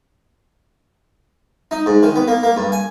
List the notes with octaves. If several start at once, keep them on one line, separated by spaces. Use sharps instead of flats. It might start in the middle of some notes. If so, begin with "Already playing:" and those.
D#4
G#2
D#3
B3
A#3
A#3
G2
G#5